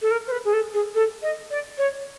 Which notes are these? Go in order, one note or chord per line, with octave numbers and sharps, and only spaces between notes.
A4
A#4
C5
B4
G#4
A4
G#4
A4
D#5
D5
C#5